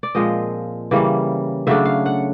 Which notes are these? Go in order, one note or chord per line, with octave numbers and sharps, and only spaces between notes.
D5
A#2 F3 G#3 C4 D#5
C#3 E3 G3 A#3
C#3 F#3 A3 D4 E5
F5
F#5